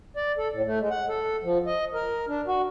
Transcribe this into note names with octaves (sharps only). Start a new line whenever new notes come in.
D5
A4
A2
A3
G#3
F#5
A4
F3
D#5
A#4
D4
F#4